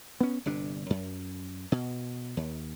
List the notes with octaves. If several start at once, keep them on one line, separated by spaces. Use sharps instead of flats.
B3 C#4
G1 C3 D4
F#2
B2
D#2